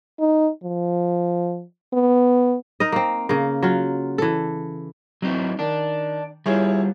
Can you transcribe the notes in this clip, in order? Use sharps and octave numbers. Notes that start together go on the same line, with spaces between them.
D#4
F3
B3
D#4 A#4 D#5
A#3 C4
C#3 A#3
F#3 F4
E3 A4
F#3 C4 D#4 E4
D#3 D4
G3 E4 F4 G#4 C#5